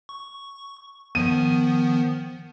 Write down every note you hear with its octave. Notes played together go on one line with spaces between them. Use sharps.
C#6
D#3 F3 B3 D#7